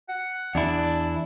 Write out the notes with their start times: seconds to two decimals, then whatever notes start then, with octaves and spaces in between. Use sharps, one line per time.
0.09 F#5
0.55 E2 D4 E4